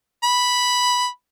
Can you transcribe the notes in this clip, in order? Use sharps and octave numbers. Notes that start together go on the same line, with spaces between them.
B5